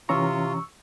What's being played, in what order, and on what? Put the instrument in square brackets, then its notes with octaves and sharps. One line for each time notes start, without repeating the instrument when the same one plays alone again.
[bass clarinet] C3 [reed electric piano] E3 C#4 A#5 [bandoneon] F4 [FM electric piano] C#6 E6